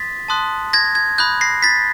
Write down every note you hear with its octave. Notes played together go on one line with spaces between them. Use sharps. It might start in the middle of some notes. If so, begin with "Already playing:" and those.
Already playing: C6 D#6 A6 B6
A5 C6 D#6 F#6
G#6 A#6
G#6
B5 D#6 F#6 G6
A#6 C7
A6 B6